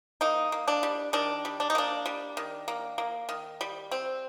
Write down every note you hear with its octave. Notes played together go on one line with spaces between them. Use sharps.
A#3 D#4
A#3
D4
G3
D#3 D4
G3
D4
D#4
A#3 D4
G3
D#3
A#3
A#3
D#3
G3
C4